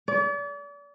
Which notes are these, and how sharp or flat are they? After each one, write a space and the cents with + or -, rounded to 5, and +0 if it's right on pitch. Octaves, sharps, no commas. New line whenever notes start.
D5 -40